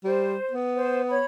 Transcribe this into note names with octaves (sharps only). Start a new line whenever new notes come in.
G3 C5
B3
C5
C#5 B5